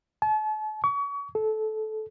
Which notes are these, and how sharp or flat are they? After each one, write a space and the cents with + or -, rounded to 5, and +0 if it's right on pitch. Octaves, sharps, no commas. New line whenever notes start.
A5 -40
C#6 +35
A4 -20